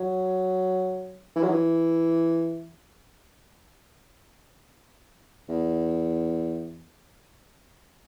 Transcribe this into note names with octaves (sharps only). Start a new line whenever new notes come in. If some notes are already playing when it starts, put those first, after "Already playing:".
Already playing: F#3
E3
F#3
E3
E2